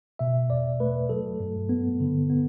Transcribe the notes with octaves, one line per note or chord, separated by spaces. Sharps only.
B2 E5
E2 D5
A3 B4
F#3 A4
G2
B3
D3
B3